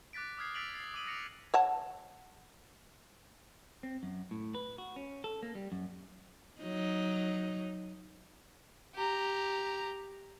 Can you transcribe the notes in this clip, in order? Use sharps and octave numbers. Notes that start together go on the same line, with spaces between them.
D6 F#6 A6 B6 D7
D6 D#6 F6 G#6 C7
E6 A6 B6 D7 F7 F#7
A6 C7
D6 D#6 D#7 F#7
D6 A#6 C#7 D7 F7
C#5 F#5 A5
C4
F#2
A2
B4
F#4
C#4
A4
A#3
G3
F#2
F#3 D#4
G4 A#5